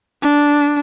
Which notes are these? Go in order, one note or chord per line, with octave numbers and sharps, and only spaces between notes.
D4